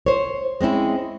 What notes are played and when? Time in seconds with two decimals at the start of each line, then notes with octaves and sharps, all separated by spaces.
0.06 C5 C#5
0.61 G#3 C4 C#4 E4